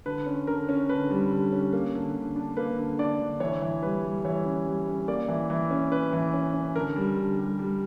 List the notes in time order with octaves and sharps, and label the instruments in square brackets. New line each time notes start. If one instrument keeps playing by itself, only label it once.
[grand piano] D3 B4
C#4
D3 A#4
C#4
D3 B4
G3
D3
C#4
A#3
D3
D3
D4
A#3 B4
D3
D4 D5
D3
E3 C#5
E3
G3 B4
G3
E3 C#5
C#4
G3
C#4
A#3 D5
E3
E3
C#4
C#4 B4
E3
C#4
C#4
D3 A#4
G3
D3
G3
G3